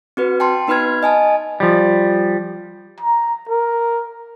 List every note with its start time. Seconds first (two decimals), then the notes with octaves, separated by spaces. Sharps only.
0.17 C4 F#4 B4
0.40 G5 A5 C6
0.67 B3 D#4 B4 B5 F6 G#6
1.03 D#5 G#5 A5
1.60 F3 G3
3.00 A#5
3.49 A#4